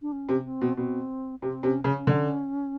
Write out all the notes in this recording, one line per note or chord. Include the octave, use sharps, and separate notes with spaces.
D4
C#4
C3
C4
B2
B2 C4
C3 C4
C3 C#4
C#3 C#4
D3